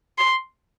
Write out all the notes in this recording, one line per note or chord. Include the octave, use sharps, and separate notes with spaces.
C6